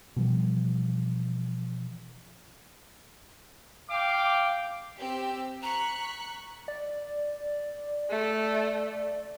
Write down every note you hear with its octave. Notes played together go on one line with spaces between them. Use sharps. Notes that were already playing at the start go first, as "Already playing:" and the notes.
B2 E3 F3 G3
F5 G5 D6
C4 G4 E6
A#5 C#6 F#6 B6
D5
A3